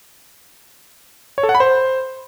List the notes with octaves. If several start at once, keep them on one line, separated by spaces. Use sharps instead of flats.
C#5
A4
F#5
B5
C5